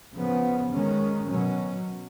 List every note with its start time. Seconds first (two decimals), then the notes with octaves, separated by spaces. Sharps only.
0.16 C#3 F3 B3
0.73 D#3 G#3 C#4
1.31 B2 F#3 C#4